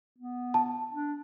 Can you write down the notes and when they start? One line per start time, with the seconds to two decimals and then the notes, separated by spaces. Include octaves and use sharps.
0.18 B3
0.54 A5
0.93 D4